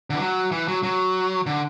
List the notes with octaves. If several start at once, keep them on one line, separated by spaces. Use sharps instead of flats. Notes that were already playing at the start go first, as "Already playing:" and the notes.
D3
E3
F#3
E3
F#3
F#3
D3